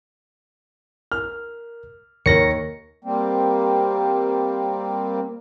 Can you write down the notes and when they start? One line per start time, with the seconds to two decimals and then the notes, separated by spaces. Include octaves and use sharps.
1.12 A#4 F6
2.26 D#2 A#4 C#5 A#6 C#7
3.04 G3 A#3 C4